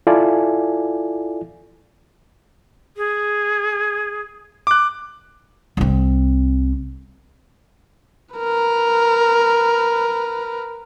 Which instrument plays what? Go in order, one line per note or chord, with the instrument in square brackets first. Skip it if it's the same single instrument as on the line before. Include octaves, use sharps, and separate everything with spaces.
[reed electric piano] E4 F4 A4 D5 G#5
[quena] G#4
[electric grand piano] D6 F#6
[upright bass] C2 C4
[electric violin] A#4 B4